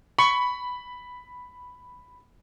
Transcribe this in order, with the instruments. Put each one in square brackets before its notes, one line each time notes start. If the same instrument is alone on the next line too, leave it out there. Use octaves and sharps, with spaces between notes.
[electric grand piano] B5 [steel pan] C#6